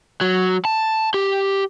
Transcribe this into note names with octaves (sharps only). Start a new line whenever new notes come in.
F#3
A5
G4